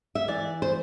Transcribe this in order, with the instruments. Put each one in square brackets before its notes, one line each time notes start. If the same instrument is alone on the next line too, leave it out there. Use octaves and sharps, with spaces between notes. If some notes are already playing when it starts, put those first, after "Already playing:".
[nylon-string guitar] E5
E3 D5
C5